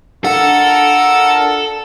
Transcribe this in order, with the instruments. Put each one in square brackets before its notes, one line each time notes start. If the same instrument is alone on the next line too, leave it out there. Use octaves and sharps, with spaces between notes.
[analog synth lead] D4 [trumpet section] F4 A#4 [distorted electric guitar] A4 [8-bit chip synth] F#5